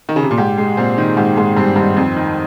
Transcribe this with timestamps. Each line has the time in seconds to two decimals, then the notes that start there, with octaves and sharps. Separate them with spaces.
0.09 D#3
0.16 C#3
0.23 C3
0.31 A#2
0.38 G#2 G4
0.58 G#3
0.77 A#2 C4
0.98 D#3
1.17 G#2 G4
1.37 G#2 G#3
1.57 G2 C4
1.76 G2 D#3
1.96 F2 C4
2.16 D#3